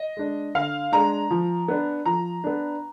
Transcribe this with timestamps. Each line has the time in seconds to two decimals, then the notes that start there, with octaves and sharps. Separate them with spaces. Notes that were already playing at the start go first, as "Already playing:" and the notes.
Already playing: D#5
0.17 G#3 D4
0.55 D3 F5
0.92 G#3 D4 A#5
1.31 F3
1.68 B3 D4
2.06 F3 A#5
2.44 B3 D4